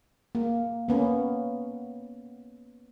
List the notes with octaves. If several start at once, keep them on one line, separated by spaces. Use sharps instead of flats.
A#3
A#3 B3 C#4